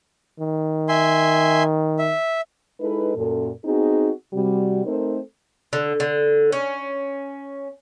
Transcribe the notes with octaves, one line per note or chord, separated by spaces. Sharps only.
D#3
E5 G#5 C6
E5
G#3 D#4 E4 A4 B4
F#2 A#2 A4
B3 C4 D#4 F#4 G#4
C3 G3 F#4
A3 C4 D#4 A4 A#4 C5
D3
D3
C#4